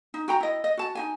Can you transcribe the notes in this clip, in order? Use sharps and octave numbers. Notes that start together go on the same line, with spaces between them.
D#4
F#4 G5 A#5
E4 D#5
D#5
F#4 A5
D#4 F#4 G#5